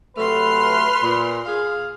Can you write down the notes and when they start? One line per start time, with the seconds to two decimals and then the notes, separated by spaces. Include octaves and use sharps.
0.17 C3 F#3 A3 B4 C6 F6
1.03 A#2
1.46 G#4 F5